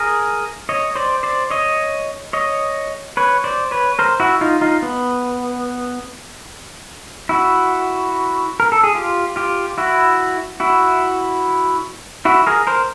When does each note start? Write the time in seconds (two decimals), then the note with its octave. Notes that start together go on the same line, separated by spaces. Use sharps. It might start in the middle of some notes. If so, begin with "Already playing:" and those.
Already playing: G#4 A#4
0.69 C#5 D#5
0.96 C5 D5
1.23 C5 D5
1.51 C#5 D#5
2.33 C#5 D#5
3.17 B4 C#5
3.44 C5 D5
3.71 B4 C#5
3.99 A#4 C5
4.20 E4 F#4
4.41 D#4 F4
4.61 D#4 F4
4.82 B3
7.29 E4 F#4
8.60 A#4
8.72 A4
8.84 G#4
8.95 F4 G4
9.36 F4 G4
9.78 E4 F#4
10.60 E4 F#4
12.25 E4 F#4
12.47 G#4 A#4
12.67 A#4 C5